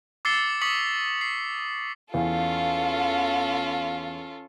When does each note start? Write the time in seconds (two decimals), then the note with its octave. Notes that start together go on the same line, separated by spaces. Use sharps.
0.25 D6 E6 A6 C7 C#7 G7
0.62 C#6 D#6 B6 C#7 F#7
1.21 C7
2.14 E2 C#4 F4 A4 F5